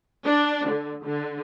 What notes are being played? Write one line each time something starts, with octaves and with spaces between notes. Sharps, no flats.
D4
D3
D3